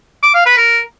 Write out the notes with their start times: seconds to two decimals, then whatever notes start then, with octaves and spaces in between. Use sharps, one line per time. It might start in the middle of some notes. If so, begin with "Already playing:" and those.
0.23 D6
0.34 F5
0.46 B4
0.57 A#4